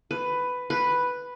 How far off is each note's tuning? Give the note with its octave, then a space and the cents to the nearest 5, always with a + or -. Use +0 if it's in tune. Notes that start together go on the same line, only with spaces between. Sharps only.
B4 +10
B4 +0